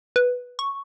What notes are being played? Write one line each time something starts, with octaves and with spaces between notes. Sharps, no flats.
B4
C#6